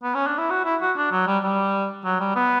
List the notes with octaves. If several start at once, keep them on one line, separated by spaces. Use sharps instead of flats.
B3
C#4
D4
E4
F#4
E4
F#4
D4
F#3
G3
G3
F#3
G3
B3